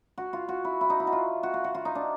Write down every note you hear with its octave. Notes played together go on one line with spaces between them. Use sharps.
F#4
F4
F#4
E4
E4
D#4
E4
F#4
F4
F#4
F4
F#4
F4
D#4
D4